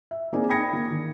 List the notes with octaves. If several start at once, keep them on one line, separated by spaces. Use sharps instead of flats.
E5
A#3 C4 D#4 G#4 D5 G#5
G5 B5 D#6 G#6 A#6 C#7
A#3
D#3